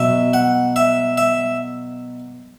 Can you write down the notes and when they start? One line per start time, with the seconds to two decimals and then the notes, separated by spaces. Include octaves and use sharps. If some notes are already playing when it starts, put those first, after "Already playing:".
Already playing: B2 F#3 E5
0.34 F#5
0.76 E5
1.18 E5